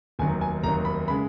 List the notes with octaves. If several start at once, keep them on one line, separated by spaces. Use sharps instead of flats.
F1 D#2 D#3 F#3 G#5
G#5
F1 D#2 D#3 F#3 A#5
B5
C#3 G#3 B5